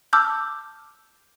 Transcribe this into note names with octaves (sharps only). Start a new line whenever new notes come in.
A5 D6 E6 F6 G6